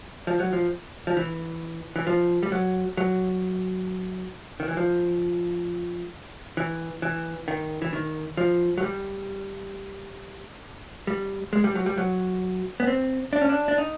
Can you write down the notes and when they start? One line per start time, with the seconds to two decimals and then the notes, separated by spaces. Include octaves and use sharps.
0.27 F3
0.40 F#3
0.53 F3
1.07 F3
1.17 E3
1.96 E3
2.07 F3
2.43 G3
2.52 F#3
2.97 F#3
4.60 D#3
4.68 E3
4.77 F3
6.57 E3
7.02 E3
7.48 D#3
7.82 E3
7.93 D#3
8.37 F3
8.78 F#3
8.83 G3
11.07 G3
11.53 G#3
11.64 G3
11.75 F#3
11.86 G3
11.98 F#3
12.80 B3
12.87 C4
13.33 D4
13.41 C#4
13.49 D4
13.68 D4
13.78 D#4